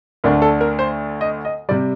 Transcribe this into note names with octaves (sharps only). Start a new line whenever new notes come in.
D2 D3 A3 D4 A#4
A4
A#4
C5
D#5
D#5
C3 G3 D5